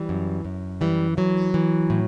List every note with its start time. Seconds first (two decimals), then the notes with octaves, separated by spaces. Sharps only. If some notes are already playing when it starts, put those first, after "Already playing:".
Already playing: E3 G3
0.09 F#2
0.45 F#2
0.81 E3 G3
1.17 E3 F#3
1.54 E3
1.90 A2